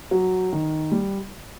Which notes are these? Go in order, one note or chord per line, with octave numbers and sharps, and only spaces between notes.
F#3
D#3
G3